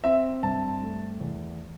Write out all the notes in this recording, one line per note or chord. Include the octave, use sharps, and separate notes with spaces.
C4 E5
G2 A5
A3
E2